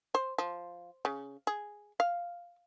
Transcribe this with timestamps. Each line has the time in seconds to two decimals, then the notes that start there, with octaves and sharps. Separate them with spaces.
0.15 C5
0.38 F3
1.05 C#3
1.47 G#4
2.00 F5